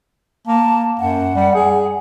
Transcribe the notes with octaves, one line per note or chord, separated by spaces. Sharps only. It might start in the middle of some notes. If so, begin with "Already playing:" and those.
A#3 A5
F#2 F#5
G3
G#4